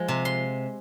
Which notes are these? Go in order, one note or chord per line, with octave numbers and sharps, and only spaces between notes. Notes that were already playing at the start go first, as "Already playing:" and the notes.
Already playing: F3 G#3
C3
C6